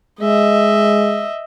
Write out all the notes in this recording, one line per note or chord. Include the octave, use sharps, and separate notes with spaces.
G#3 D#5 E5